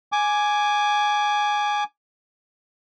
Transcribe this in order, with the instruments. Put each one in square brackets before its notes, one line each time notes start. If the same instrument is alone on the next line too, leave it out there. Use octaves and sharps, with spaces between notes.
[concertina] G#5 D6